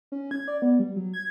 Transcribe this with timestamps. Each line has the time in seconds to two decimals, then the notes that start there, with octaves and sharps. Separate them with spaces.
0.12 C#4
0.31 G#6
0.48 D5
0.62 B3
0.79 G3
0.96 F#3
1.14 G#6